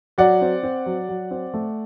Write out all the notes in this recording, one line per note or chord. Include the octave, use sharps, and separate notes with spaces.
F#3 D5 F#5
C4
C4
F#3
F#3
C4
A3